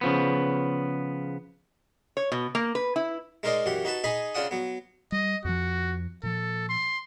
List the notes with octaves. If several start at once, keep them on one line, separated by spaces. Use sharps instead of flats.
C#3 F3 B3
C#5
B2
A#3
B4
E4
G#3 D#4 A#4 C5 D5 D#5
F#2 E3 G4 F#5
D#4 F#4 B4 A5
D#4 G#4 D#5 G#5 B5
C#3 D4 F4 D5 F#5 D#6
F#3 B3
G3 D#5
F2 F3 F#4
A#2 F3 A4
C6